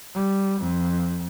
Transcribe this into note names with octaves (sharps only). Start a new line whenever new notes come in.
G3
F2